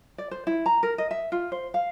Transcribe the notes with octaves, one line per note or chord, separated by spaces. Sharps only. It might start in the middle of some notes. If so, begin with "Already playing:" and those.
D5
C5
E4
A#5
A#4
D#5
E5
F4
C5
F5